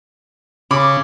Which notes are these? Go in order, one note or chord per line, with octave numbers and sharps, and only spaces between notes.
C#3 B5 D6